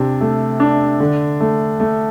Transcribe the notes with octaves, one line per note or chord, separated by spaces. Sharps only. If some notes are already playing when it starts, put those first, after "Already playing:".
Already playing: C3 D4
A3
D4
D3
A3
A3